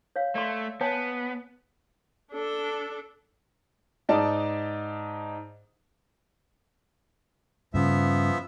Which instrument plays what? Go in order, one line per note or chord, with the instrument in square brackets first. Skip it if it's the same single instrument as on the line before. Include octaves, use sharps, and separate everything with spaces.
[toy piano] C#5 F5
[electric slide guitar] A3 [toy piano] D5 C6
[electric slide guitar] B3 [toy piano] C#5 G#5 A5
[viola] D4 A4
[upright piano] G#2 D#4 D5 A5
[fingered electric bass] G2 C#3 [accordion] F3 B3 E5